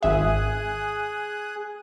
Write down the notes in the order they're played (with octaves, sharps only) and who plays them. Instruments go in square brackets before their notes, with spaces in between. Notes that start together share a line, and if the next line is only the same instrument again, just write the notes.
[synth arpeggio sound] G#1 E5 [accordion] G#4 D#6 F#6